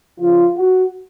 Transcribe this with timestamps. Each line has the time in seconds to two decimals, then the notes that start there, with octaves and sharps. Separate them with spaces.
0.19 C#3 F3 F4
0.58 F#4